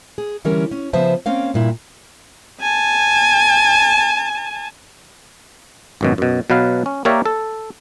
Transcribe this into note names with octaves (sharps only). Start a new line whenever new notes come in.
G#4
D3 E3 G3 C#4 A#4
C#4
C#3 F3 B3 C5 E5 A5
A#3 C4 C#4 F5
G2 A#2 E4
G#5 A5
G#1 F#2 B2
F#2 B2
B2 F#3 B4 F5
C#4
A#3 G4 A#4 C#5 D5 E5
A4